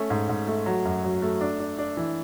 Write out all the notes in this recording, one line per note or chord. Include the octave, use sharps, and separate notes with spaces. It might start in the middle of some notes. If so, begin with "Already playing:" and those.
Already playing: A3 C#4
G#2
G#2
A3
F#3
F#2
F#3
A3
D4
D4
D4
E3